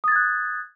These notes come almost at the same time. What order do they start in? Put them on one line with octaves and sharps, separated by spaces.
D#6 A6 G#6 F#6